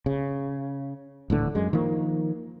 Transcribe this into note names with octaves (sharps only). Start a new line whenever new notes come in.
C#3
D#1 A2 D3 E3
F#2 G#3
D#3 F3 A#3